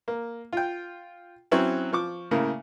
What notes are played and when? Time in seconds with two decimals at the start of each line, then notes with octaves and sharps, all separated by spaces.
0.08 A#3
0.53 F4 G5
1.51 F#3 C4 C#4 E4
1.93 F3 C#6 D6
2.31 A2 C#3 A#3